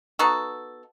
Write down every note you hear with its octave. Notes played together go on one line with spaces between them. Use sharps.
B3 D#4 F#4 A4